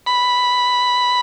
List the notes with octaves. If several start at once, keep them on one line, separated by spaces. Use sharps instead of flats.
B5